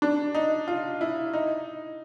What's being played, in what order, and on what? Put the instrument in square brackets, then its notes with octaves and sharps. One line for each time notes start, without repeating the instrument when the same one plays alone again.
[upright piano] D4
D#4
F4
E4
D#4